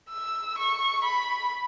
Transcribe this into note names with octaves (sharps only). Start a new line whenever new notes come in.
E6
C#6
B5